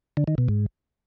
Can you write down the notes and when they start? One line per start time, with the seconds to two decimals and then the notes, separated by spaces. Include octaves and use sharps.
0.17 D3
0.28 D#3
0.38 B2
0.49 G#2